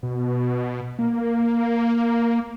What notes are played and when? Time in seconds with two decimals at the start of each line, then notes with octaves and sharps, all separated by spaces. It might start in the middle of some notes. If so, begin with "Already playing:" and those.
0.03 B2
0.99 A#3